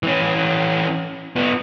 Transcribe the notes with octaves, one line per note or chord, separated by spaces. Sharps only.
E3 C#4
B3 F4